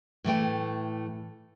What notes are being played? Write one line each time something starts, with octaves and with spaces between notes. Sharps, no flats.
A2 E3 A3 G5